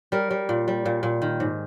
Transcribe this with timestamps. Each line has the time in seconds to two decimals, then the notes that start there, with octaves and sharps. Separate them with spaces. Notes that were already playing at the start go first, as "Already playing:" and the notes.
0.12 G3 A#4
0.31 G3
0.49 A#2
0.68 G3
0.85 A#2
1.03 A#2
1.22 D#3
1.40 G#2